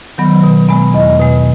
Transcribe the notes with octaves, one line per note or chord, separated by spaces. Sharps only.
D#3 F#3 B3
B2
G#3 B3
E2 D#5
B2 G#3